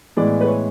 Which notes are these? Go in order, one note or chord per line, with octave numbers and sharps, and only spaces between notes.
A2 E3 G#3 B3 D5
B4
C#5